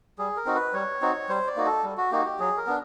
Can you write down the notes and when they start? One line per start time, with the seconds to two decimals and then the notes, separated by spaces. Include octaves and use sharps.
0.19 G3 G#4
0.37 A#4
0.46 C4 D#4 F#4
0.55 B4
0.73 G3 C#5
1.01 C4 D#4 F#4
1.29 G3 C5
1.47 D5
1.56 A#3 D#4 F#4
1.66 A4
1.84 G3
1.98 F#4
2.12 A#3 D#4 F#4 G4
2.25 G4
2.39 F#3 G#4
2.57 A#4
2.67 B3 D4